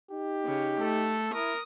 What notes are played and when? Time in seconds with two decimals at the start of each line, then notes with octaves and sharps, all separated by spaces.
0.11 D#4 G4
0.45 C#3
0.80 A3 A4
1.34 E4 A#4 D#6